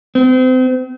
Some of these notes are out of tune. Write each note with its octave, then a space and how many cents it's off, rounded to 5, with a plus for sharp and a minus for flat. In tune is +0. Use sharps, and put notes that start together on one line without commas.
C4 -35